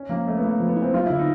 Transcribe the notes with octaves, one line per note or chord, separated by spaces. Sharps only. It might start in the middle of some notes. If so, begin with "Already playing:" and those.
Already playing: C#4
F3 A#3
F3 A3
B3
A3 A#3
F3
B3
E4
C4
F#3 F4
E4
D3
D#4